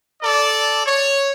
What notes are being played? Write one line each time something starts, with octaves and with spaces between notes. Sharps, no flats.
A4 D5
C#5